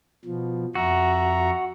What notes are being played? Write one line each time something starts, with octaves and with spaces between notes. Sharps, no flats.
B2 F3
F2 F#4 E5 A#5